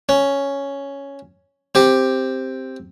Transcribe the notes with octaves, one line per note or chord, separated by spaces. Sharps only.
C#4
C4 G4